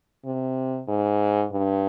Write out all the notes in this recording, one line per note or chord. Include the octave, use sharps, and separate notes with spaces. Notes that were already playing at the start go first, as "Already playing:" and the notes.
C3
G#2
G2